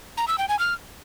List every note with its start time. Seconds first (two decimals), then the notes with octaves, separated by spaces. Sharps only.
0.17 A#5
0.28 E6
0.38 G5
0.49 G#5
0.59 F6